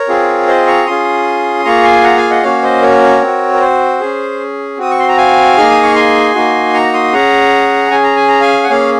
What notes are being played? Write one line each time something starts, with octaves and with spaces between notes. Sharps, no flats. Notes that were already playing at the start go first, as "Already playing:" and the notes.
Already playing: A#4 C#5
C4 F4 G#4
C5 D#5
A#5 C#6
C#4 F4 G#4 C6 D#6
A#3 F4 G#4 A#5 C#6
G#5 C6
F#5 A#5
F5 G#5
D#5 F#5
A#3 C#4 F#4 C#5 F5
C5 D#5
A#4 C#5
C4
F#4
A#4
C5
C#4 G#4
C4 F#4 D#6
C#6
C6
A#5
F5 G#5
A#3 D#4 G#4 F6
D#6
C#6
G#5 C6
A#3 D#4 F#4
A#5 C#6
C6 D#6
C#4 G#4 F#5 A#5
C#4 G#4 G#5
A#5
G#5
A#5
F5 G#5
F#5
A#3 C#4 G#4 C#5 F5